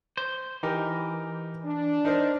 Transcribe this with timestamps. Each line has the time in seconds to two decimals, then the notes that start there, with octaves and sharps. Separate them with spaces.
0.17 C5
0.63 E3 D#4 G4 A#4
1.64 D4
2.05 D#4 A#4 C5